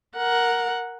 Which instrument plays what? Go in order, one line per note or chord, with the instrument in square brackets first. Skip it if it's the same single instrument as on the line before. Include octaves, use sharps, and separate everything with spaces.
[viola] A#4 F#5